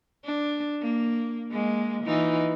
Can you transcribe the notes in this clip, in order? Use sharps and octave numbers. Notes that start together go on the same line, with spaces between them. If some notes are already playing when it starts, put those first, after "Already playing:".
D4
A#3
G#3 A#3
E3 D#4 F4